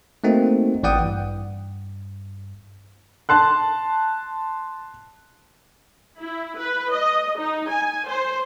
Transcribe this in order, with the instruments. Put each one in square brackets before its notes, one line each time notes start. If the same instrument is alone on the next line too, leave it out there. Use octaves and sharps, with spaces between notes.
[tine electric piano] A3 A#3 C4 D#4 F#4
A1 E3 D5 F#5 G5 D#6
G2
[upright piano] A5 C6 F#6
[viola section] E4
B4
D#5
D#4
G#5
C5